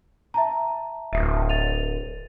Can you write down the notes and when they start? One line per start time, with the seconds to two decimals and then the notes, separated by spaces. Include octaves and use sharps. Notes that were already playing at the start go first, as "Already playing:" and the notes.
0.34 E5 A5 A#5
1.13 D1 E5 D#6
1.49 A6 D#7 F7